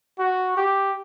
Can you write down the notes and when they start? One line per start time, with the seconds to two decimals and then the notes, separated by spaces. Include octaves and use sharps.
0.19 F#4
0.57 G4